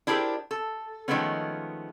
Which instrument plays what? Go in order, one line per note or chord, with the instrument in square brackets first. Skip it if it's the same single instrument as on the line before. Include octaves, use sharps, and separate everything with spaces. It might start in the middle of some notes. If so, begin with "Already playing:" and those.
[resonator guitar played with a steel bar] D4 E4 G4 G#4 A#4 C5
A4
D#3 F3 G#3 A3 B3 C#4